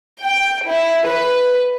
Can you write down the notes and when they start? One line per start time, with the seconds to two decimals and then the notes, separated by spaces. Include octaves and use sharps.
0.23 G5
0.68 E4
1.07 B4